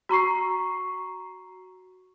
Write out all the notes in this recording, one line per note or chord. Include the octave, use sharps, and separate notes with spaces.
F#4 A#5 C#6 C7